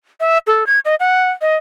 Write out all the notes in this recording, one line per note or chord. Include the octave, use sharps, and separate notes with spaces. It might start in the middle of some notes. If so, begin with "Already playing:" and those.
E5
A4
G#6
D#5
F#5
D#5